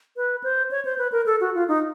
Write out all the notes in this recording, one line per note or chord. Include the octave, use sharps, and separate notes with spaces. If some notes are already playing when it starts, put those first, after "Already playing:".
B4
C5
C#5
C5
B4
A#4
A4
F#4
F4
D#4